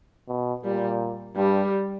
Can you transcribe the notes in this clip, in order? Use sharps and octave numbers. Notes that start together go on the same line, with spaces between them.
B2
A#2 G3
G2 G3